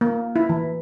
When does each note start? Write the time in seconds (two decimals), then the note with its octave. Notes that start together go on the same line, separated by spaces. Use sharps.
0.01 A#3
0.36 E4
0.49 E3